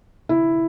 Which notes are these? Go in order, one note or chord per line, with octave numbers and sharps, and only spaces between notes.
E4